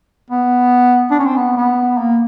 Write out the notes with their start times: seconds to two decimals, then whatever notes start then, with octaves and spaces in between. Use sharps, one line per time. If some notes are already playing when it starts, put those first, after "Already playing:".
0.30 B3
1.11 D4
1.19 C#4
1.27 C4
1.36 B3
1.57 B3
1.98 A#3